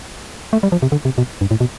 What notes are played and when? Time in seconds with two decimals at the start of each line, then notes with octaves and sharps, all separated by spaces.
0.53 A3
0.63 G3
0.72 F3
0.82 C3
0.92 D3
1.05 C3
1.18 B2
1.41 G2
1.51 A2
1.60 B2